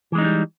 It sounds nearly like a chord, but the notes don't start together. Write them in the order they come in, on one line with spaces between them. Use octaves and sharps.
E3 G#3 D#4 D4 G3